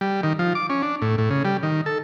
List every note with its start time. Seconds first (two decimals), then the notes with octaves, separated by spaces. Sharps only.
0.01 G3
0.23 D#3
0.39 F3
0.55 D6
0.70 C#4
0.83 D4
1.02 A2
1.18 A2
1.30 C#3
1.45 G3
1.63 D#3
1.86 A4